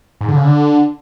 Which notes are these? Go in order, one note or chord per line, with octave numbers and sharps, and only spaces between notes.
G#2
D3
C#3
D3